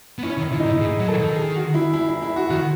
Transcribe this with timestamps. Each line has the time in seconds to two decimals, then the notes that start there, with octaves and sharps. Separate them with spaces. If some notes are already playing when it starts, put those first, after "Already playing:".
0.19 B3
0.23 C#4 E4
0.38 D#3
0.51 C#3 E4
0.59 D#4
0.66 A2 E4
0.80 A2 G#4
0.99 F#3
1.08 A4
1.18 D#3
1.36 G#4
1.56 F#4
1.74 E4
1.94 E4
2.08 E4
2.22 E4
2.36 F#4
2.50 D#3 F#4